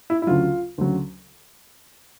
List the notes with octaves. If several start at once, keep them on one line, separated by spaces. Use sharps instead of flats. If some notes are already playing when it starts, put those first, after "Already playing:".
E4
E4
D2 C#3 F#3 F4
D2 C#3 F#3